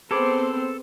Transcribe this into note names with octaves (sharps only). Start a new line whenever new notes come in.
B3 C4 G#4 A4 B4 C5 D6